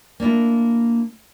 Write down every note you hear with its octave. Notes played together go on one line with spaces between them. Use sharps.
A#3 D4 E4 F4